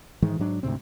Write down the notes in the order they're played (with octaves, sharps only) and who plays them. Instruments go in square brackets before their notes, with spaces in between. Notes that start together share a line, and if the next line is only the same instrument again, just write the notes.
[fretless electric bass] G#2 D#3 E3 G#3
G#2 F#3 D4
D2 G#2 C3 C4